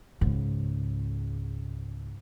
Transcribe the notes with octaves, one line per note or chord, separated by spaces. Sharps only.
C#2 G#2